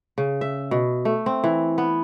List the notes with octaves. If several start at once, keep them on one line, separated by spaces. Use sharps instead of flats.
C#3
E5
B2
A3
C4
E3
B3